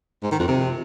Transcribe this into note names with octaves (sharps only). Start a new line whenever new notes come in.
G#2
D#3
F2
C3